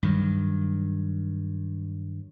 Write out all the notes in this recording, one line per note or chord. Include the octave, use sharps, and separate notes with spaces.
G2 D#3 F#3